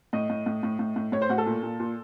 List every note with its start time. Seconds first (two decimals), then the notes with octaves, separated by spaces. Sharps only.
0.13 A2 D#5
0.30 A2
0.46 A2
0.63 A2
0.79 A2
0.96 A2
1.12 A2 C#5
1.22 C5
1.30 A2 F#4
1.38 A4
1.46 A#2
1.63 A#2
1.80 A#2